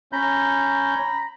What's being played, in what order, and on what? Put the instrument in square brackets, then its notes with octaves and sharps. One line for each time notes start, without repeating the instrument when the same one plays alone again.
[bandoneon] C#4 G6 [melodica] A#5 B5